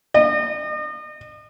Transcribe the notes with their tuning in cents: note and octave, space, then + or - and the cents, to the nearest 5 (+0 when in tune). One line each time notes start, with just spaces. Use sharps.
D#5 -40